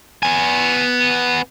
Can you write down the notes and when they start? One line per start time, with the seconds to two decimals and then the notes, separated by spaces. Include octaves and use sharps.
0.23 B3 G#5